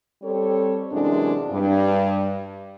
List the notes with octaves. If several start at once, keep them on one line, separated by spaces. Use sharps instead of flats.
G3 C4 G4 A4 C#5
F#2 C3 E3 G#3 D4
G2